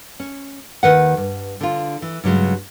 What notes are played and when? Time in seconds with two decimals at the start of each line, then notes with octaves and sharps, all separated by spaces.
0.20 C#4
0.83 D#2 G#2 D#3 B4 F#5
1.17 G2
1.61 D3 F4
2.02 E3
2.24 G2 C#3 F#3 G#3